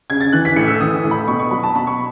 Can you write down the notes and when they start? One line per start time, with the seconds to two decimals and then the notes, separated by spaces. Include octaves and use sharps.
0.10 C#3 G#6
0.21 A6
0.33 E3 F#6
0.45 B6
0.56 A2 C#7
0.68 E6
0.80 E3 D#6
0.96 D#6
1.04 A2
1.11 B5
1.28 B2 C#6
1.40 C#6
1.51 F#3 B5
1.63 A5
1.75 B2 B5
1.87 C#6